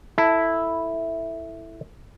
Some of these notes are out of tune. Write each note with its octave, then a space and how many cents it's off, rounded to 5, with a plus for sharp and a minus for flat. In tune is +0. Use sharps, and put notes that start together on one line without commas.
E4 +0 A4 +5